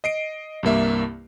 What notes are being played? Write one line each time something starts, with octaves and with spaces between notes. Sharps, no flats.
D#5 C7 D7
C2 G2 A#3 E5